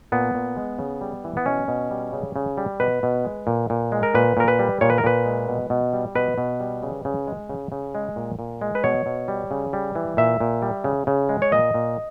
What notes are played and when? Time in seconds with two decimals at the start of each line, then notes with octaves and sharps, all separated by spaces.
0.12 A#2 B3
0.34 A#2
0.57 G#3
0.79 C#3
1.01 G3
1.24 E3
1.37 B3
1.46 B2 C#4
1.68 B2
1.91 G3
2.13 C#3
2.36 C#3
2.57 G3
2.80 B2 B4
3.03 B2
3.25 G#3
3.47 A#2
3.70 A#2
3.92 G#3
4.03 A#4
4.14 A#2 B4
4.37 A#2 A#4
4.48 B4
4.59 G3
4.81 A#2 C#5
4.90 B4
4.98 A#4
5.04 A#2 B4
5.26 G#3
5.48 B2
5.70 B2
5.93 G3
6.15 B2 B4
6.38 B2
6.60 G3
6.83 C#3
7.05 C#3
7.27 G#3
7.49 C#3
7.72 C#3
7.95 G#3
8.16 A#2
8.39 A#2
8.61 G#3
8.75 B4
8.84 B2 C#5
9.06 B2
9.28 G3
9.51 C#3
9.73 G3
9.95 E3
10.17 A#2 E5
10.40 A#2
10.62 G3
10.84 C#3
11.07 C#3
11.29 G#3
11.42 C#5
11.52 A#2 D#5
11.74 A#2